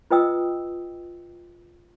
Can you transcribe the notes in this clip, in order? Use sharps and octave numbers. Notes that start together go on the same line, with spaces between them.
F4 B4 D#5 G5 D#6 E6